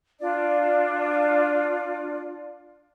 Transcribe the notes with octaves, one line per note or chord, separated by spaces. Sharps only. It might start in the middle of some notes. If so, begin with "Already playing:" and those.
D4 F4 D5